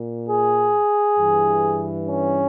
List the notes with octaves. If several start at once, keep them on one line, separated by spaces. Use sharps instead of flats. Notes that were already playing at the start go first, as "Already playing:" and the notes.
Already playing: A#2
G#4
G2 E3
C#4